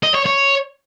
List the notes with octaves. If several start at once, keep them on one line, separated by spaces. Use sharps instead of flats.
D#5
C#5
C#5